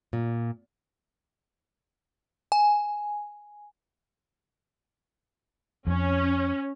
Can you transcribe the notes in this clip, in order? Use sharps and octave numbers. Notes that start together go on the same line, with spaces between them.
A#2
G#5
F2 C#4